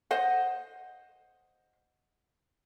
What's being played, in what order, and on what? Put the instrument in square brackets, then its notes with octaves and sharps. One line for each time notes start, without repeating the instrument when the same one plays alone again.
[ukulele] C5 D#5 F#5